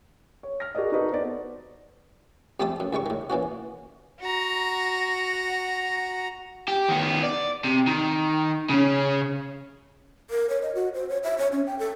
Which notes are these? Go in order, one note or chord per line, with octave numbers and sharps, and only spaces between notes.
C#5
F6 A#6
F#4 G#4 A#4 D5 D#5
D#4 F#4 A4 B4 D#5
B3 C5 D5
F2 G3 A3 G4 A5 D#6
F#2
C#2 D#3 G3 C#6
A2 D#3
A#2 E3 C#4 F#4
F#4 A#5
G4
D#3 B3
D5
C3
D#3
C#3 C#4
A#4
C#5
D#5
F#4
C5
C#5
E5
C#5
C#4
G5
A4